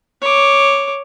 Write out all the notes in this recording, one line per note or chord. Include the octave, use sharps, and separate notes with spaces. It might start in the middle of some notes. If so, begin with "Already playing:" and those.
C#5 D6